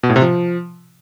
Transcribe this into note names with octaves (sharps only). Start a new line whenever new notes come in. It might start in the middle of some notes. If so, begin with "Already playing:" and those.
B2
A2
C3
F3